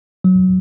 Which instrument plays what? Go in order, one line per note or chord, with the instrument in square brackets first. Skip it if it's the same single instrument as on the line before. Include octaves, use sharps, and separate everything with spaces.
[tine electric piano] F#3